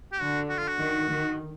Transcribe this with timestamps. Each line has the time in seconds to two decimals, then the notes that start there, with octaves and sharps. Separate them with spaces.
0.13 G4
0.20 D3 F#4
0.50 F#4
0.59 F4
0.68 F#4
0.79 D#3
1.08 D#3